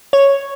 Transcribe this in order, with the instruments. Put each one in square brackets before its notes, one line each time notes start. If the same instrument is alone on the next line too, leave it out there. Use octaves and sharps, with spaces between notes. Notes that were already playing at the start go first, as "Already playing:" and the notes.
[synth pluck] C#5